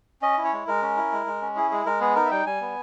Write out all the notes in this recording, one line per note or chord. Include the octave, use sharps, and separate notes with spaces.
C#4 D#5
E4
C#5
G#3
G#3 A#4
C#4
E4
G#3
G#3
C#4
E4 G#4
G#3 G#4
G#3 A#4
B3 G#4
D#4 A#4
E5
G3 G5
G3 G#5
B3